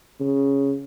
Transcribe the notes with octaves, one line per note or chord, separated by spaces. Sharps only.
C#3